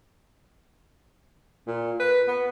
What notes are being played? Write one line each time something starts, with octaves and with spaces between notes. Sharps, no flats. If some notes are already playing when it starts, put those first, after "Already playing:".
A#2
B4
B3